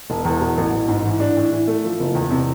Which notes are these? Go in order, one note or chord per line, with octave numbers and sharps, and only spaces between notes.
E1
E2
B2
A1
A1
G#2
E3
D4
A2
E3
A3
F3
F#1
E2
C3